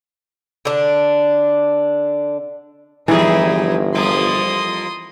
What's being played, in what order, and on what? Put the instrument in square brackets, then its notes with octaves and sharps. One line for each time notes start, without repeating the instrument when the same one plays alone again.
[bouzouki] D3 D4
[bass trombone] G1 [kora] E3 [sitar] F3 G3 G#4 [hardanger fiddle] D#4 E4
[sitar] F2 G3 A#3 [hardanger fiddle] C6 D#6